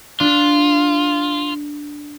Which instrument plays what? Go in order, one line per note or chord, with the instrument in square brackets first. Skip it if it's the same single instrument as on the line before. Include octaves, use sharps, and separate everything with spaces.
[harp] D4 [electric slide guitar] F4